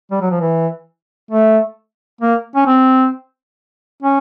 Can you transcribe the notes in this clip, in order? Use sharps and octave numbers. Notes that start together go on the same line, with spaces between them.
G3
F#3
F3
E3
A3
A#3
C#4
C4
C#4